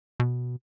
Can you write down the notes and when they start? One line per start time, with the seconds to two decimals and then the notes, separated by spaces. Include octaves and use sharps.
0.20 B2